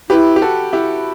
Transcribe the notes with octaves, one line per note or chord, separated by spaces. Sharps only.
E4 G4 B4
G4
F#4 A4
E4 G4